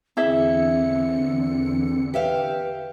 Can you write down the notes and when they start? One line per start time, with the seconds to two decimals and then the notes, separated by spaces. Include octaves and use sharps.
0.17 E2 D3 C4 E4 G#4 E5 C#7
2.14 G4 B4 E5 F5